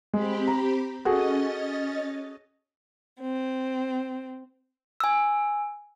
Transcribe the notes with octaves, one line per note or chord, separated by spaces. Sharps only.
G#3 C4 G4 B5
A#5
C#4 F#4 G#4 A4 D#5 A6
C4
G#5 E6